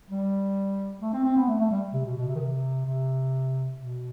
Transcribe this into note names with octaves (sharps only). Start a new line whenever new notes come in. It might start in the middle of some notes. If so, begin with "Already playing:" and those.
G3
A3
C4
C4
B3
A3
A3
G3
C3
B2
B2
C3
D#3
C3
C3
B2